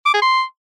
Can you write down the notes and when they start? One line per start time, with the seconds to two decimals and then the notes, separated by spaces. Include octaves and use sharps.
0.05 D6
0.14 G#4
0.22 C6